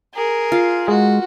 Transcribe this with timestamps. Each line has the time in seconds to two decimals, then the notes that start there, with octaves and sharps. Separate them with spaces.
0.14 G#4 A#4
0.52 F4
0.88 G#3 F#4